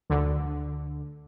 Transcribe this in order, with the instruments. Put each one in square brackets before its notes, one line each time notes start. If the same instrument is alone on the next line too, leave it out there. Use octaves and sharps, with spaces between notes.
[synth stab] D2 D3